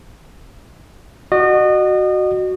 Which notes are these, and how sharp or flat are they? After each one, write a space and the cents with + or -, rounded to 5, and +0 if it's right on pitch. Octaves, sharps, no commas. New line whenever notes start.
F#4 +0 D#5 -35